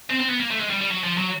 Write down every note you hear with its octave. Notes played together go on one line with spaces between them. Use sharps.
C4
C4
B3
A#3
A3
G#3
G3
G3
F#3
F3
F#3